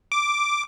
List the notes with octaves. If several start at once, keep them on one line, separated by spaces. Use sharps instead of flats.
D6